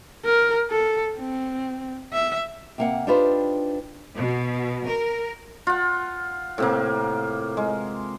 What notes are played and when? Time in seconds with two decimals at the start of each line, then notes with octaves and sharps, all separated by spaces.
0.25 A#4
0.71 A4
1.19 C4
2.13 E5
2.78 C3 A#3 F#5
3.07 D4 D#4 F4 G4 B4 C5
4.15 B2
4.88 A#4
5.67 F4 F#5
6.58 A2 C3 A#3
7.57 G#3